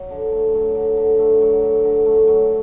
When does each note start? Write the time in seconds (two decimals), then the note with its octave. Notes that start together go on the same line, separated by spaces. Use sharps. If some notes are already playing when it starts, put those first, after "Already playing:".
Already playing: F#3
0.10 D3
0.32 A3
0.54 F#3
0.75 D3
0.97 D3
1.19 A3
1.41 F#3
1.62 D3
1.84 D3
2.06 A3
2.28 F#3